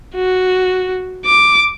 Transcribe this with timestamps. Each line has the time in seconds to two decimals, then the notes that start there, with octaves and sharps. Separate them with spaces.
0.15 F#4
1.26 D6